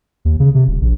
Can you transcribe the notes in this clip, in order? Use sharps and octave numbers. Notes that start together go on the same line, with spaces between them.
D#2
C#3
C3
D#1
A#1